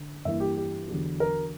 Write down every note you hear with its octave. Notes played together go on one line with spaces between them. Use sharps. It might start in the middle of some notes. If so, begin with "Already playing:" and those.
Already playing: D3
G2 E3 A#3 E4 E5
G4
G4
E2 D3 F#3
A#4